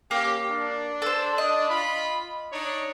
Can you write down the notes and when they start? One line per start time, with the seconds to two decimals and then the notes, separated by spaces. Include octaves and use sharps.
0.11 A#3 C#4 G4
0.50 D4
1.02 A4 C5
1.38 D#5
1.69 F4 B5
2.52 D4 D#4 C#5